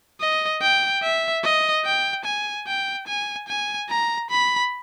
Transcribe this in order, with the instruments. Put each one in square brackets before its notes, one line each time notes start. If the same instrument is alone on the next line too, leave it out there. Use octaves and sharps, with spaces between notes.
[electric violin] D#5
G5
E5
D#5
G5
G#5
G5
G#5
G#5
A#5
B5